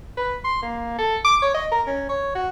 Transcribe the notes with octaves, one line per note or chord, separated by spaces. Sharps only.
B4
C6
A#3
A4
D6
C#5
D#5
A#4
C#4
C#5
F#4